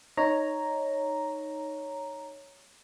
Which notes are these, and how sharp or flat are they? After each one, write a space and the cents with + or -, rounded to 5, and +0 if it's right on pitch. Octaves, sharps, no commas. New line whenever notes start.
D#4 -5 C#5 +0 A#5 +0